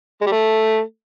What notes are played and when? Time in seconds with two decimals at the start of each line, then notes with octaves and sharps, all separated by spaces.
0.21 G#3
0.26 G3
0.32 A3